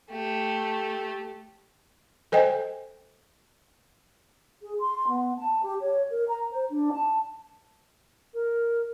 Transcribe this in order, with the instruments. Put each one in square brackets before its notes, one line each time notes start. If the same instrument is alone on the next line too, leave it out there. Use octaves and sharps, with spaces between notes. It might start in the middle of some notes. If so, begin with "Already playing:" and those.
[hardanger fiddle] A3 G4
[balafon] A4 C5 D#5 G5 G#5
[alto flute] G#4
C6
B3
A5
G4
C#5
A#4
A#5
C5
D4
A5
A#4